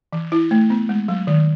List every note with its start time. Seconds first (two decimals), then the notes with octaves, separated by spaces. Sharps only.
0.13 E3
0.32 E4
0.51 A3
0.70 B3
0.89 G#3
1.08 F#3
1.27 D#3